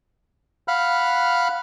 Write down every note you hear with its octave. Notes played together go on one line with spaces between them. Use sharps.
F5 F#5 B5 F6 F#6